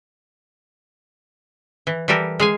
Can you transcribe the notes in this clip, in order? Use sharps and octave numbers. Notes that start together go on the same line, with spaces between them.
E3
E3 G3 G4 A4 A#4
G#3 F5 G#5